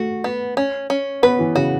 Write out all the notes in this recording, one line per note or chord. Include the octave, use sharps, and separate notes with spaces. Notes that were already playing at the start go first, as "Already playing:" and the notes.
Already playing: A3 F#4
B3
C#4
C#4
B3 B4
E3
C#3 F#4